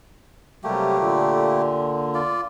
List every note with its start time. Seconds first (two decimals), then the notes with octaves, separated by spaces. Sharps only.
0.64 C3 F#3 G3 A3 A#3 G4
0.98 A#2 D3
2.15 F4 D5